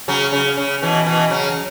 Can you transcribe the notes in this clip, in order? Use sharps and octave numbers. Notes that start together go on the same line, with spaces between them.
C#3 F#3
C#3
C#3
B2 E3
B2 E3
C#3 F#3